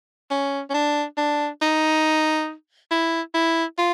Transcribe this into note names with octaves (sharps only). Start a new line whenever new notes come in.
C#4
C#4
D4
D4
D#4
E4
E4
F4